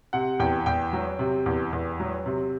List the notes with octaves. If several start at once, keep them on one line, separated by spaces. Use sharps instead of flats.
C3 F#5
E2 G5
E2 G5
F#3
C3
E2
E2
F#3
C3